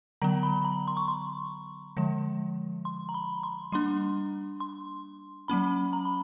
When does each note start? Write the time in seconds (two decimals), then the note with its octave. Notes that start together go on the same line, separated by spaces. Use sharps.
0.22 D3 F#3 B3 A#5
0.43 B5
0.64 A#5
0.88 C6
0.97 C#6
1.08 C6
1.97 D3 F3 G#3
2.85 C6
3.09 A#5
3.14 B5
3.43 C6
3.72 G3 A#3 D4 C6
4.60 C6
5.48 F#3 A#3 C#4 B5
5.93 A#5
6.05 B5